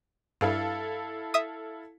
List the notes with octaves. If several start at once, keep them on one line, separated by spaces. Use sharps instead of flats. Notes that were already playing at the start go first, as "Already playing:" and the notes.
G2 E4 A4 F5
E5 D#6